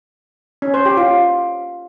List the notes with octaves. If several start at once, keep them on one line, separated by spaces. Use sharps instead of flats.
C#4
C5
G4
F4